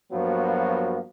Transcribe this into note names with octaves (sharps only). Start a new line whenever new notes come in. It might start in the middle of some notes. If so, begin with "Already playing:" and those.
G2 F3 F#3 A#3 B3 F#4